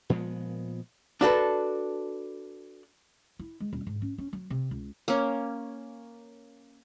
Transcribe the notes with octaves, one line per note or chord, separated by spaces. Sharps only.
A#2 F3 G#3 B3
D4 F#4 A4 B4
E4
G#3
D#1
G#2
C#4
C#4
F#3
C3
C#2
A#3 C#4